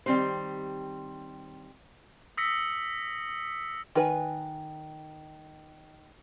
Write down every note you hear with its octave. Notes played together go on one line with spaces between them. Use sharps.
D#3 G3 C4 G4 C5
D#6 E6 A#6 B6 C#7
D#3 B4 G#5